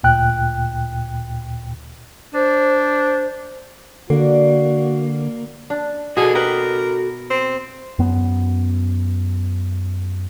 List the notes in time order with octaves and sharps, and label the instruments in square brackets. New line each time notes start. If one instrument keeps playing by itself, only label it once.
[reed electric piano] D2 A#2 G5 F#6
[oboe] D4 [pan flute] C5
[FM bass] D3 [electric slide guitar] A#3 [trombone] F#4 [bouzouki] D5 F#5
[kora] D4
[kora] B2 [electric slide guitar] F#4 A4 [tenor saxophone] G#4
[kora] G4 B4 D#5 [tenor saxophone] A#4
[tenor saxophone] C4
[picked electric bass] F#2 B3